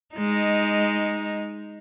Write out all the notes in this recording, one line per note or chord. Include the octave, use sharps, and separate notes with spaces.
G#3 D#4